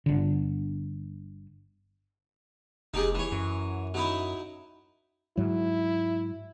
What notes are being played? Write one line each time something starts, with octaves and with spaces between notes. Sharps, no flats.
G1 D3
F1 D#4 G4 G#4
E3 C#5
F#2
F#3 D#4 E4
G#2 F#3 E4